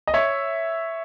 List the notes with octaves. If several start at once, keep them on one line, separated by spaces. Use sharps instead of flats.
D#5
C#5 E5